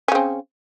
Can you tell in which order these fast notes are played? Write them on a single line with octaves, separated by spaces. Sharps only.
C#4 C#3 C4